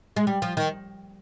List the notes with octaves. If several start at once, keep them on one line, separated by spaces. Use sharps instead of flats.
G#3
G3
F3
D#3